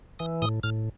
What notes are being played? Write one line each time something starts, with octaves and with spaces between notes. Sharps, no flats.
E3 D#6
A2 D#6
A2 F6